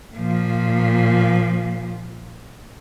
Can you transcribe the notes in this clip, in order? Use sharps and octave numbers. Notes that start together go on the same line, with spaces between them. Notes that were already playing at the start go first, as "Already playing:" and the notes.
A#2 F3